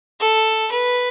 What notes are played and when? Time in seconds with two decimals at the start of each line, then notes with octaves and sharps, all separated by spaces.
0.20 A4
0.72 B4